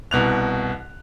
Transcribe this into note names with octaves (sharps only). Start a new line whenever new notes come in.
C2 B2 F#6 F7